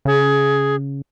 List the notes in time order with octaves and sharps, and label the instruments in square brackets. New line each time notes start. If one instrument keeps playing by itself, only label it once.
[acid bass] C#3 [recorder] G#4